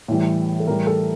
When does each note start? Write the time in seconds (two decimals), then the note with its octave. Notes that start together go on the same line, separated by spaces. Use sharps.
0.08 A2 E3 G3
0.60 A4
0.67 A2 E3 G3 A#4
0.87 A4